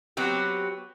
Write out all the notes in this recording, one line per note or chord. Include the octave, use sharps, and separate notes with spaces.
F#3 B3 C4 F#4 G4